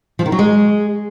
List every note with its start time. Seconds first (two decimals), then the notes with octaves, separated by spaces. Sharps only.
0.19 F3
0.26 D#3
0.32 F#3
0.39 G#3